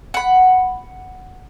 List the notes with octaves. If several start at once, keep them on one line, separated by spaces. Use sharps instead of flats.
F#5 B5